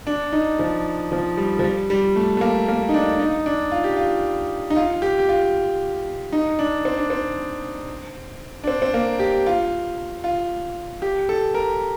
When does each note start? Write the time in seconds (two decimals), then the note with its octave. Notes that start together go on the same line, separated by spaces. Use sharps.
0.07 D4
0.33 D#4
0.59 F3
1.12 F3
1.37 G3
1.59 F3
1.63 G3
1.90 G3
2.16 A3
2.37 A3
2.41 A#3
2.68 A#3
2.89 D#4
2.94 D4
3.20 D#4
3.46 D4
3.72 F4
3.84 G4
3.96 F4
4.70 D#4
4.77 F4
5.02 G4
5.19 G4
5.29 F4
6.33 D#4
6.59 D4
6.85 C4
6.98 D4
7.10 C4
8.64 D4
8.67 C4
8.82 C4
8.94 A#3
9.19 G4
9.47 F4
10.24 F4
11.02 G4
11.29 A4
11.55 A#4